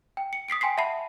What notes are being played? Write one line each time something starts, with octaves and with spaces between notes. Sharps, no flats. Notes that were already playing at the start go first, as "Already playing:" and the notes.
G5
C#7
D#6 B6 C7 D7
G5 G#5 C6 B6 C7
E5 F#5 A5 B5 C7